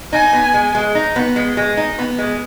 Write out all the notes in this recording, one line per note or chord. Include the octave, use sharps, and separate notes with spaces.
D#4 G#5
B3
G#3
G#3
D#4
B3
G#3
G#3
D#4
B3
G#3